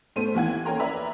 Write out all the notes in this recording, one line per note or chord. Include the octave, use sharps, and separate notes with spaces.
A2 B3 A4 C5 D#7
D#2 E3 F#5 G#6
C#4 A4 A#4 G5 A#5 C6
B4 D5 E5 A#5 B5